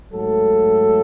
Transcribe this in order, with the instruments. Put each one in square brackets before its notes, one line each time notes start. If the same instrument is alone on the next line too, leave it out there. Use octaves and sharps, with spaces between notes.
[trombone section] G#2 F#3 A3 A4